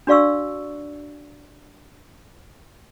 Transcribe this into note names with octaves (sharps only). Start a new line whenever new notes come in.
D4 F#4 D5 F5 C#6 E6